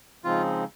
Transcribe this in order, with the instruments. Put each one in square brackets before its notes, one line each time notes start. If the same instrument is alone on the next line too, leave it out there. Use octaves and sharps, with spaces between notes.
[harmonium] C#3 F3 G#3 C4 D#4 [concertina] F4